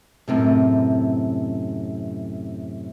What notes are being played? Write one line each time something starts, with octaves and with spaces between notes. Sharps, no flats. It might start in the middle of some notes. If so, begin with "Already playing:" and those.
F#2 A2 C3